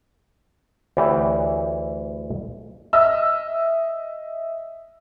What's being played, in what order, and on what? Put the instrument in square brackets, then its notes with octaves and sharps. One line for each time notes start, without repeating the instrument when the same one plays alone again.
[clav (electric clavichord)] D2 E3 G4 C#5 G#5
[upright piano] D#5 E5 E6 F6